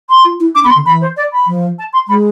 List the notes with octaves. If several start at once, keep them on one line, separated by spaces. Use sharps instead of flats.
C6
F4
E4
D4 D6
B3 B5
C6
D3
E3 B5
C5
D5
B5
F3
A5
C6
G#3 B5